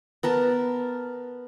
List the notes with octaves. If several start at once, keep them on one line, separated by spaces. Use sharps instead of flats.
B3 A#4 A5